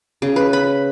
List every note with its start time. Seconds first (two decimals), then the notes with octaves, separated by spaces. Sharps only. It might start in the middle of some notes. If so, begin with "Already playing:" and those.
0.22 C#3
0.36 B4
0.53 B5